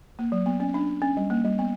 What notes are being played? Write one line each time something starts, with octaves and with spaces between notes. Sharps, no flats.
A#3
F#3
B3
C#4
D4
C#4
G3
A#3
G3
B3